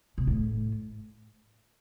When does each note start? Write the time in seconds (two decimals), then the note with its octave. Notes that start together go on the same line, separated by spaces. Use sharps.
0.18 B2
0.27 A2